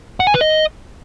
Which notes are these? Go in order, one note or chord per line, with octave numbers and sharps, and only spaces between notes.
F#5
G#5
B4
D#5